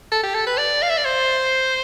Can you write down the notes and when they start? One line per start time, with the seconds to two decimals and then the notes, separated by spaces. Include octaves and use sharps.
0.12 A4
0.23 G4
0.35 A4
0.47 B4
0.58 D5
0.82 F5
0.90 E5
0.97 D5
1.05 C5